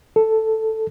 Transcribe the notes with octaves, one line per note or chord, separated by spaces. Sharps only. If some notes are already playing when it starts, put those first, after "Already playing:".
A4